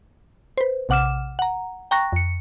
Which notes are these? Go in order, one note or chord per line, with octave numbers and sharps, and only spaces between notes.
B4 C5
A#1 C3 F#5 D6 F6 E7
F#5 A#5
G5 A#5 C#6 F#6 A#6
F2 C#7